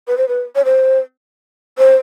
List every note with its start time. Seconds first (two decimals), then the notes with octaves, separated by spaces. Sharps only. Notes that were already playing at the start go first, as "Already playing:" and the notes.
0.07 B4
0.18 C5
0.28 B4
0.55 C#5
0.65 C5
1.78 C5